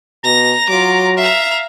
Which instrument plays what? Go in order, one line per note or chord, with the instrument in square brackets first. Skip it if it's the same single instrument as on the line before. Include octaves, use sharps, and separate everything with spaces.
[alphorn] B2 [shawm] A#5 [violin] A#6
[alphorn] F#3 [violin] F4 D6
[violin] E5 A#5 [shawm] F5